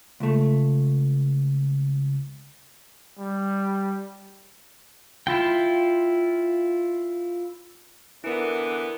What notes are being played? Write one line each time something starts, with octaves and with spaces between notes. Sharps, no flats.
C#2 A3
G3
E4 F4 G5
D3 E3 B3 E4 A#4